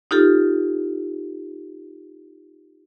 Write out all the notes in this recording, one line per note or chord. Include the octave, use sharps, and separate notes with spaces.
D#4 F4 G4 A4